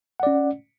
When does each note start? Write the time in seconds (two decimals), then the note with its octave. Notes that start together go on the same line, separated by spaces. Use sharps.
0.20 F#5
0.23 D5
0.27 C#4